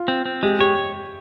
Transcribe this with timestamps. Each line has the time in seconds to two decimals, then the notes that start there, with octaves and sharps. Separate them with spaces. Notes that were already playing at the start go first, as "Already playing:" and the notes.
Already playing: F4
0.08 C4
0.26 C4
0.43 G#3 G4
0.59 G4 C#5